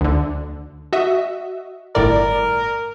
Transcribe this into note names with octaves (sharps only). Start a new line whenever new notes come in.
D2 D3
F#4 D#5 E5
G1 A2 A#4 D5